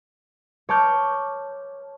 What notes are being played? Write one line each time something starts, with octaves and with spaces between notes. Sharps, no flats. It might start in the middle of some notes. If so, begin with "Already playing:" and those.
C#5 A5 D6 F6 G6